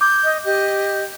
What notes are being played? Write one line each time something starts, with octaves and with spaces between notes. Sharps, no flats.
D6 G6
D#5
G4 D#5